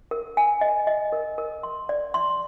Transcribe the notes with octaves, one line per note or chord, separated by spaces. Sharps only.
A#4
G#5
D#5
D#5
A#4
A#4
C6
D5
C6